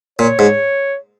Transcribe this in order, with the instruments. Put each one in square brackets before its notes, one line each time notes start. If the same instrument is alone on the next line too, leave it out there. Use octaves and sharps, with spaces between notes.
[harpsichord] A#2 [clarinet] C#5
[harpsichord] G#2